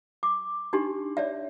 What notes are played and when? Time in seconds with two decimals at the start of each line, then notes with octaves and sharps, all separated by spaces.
0.23 D6
0.73 D4 D#4 G4 C6
1.17 C#5 D5 E5